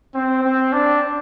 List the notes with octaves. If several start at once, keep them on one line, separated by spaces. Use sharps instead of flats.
C4
C4
D4